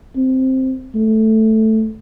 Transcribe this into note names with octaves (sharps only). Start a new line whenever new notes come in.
C4
A3